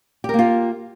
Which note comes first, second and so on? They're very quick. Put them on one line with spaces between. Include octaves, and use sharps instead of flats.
G4 A#4 A#3 F4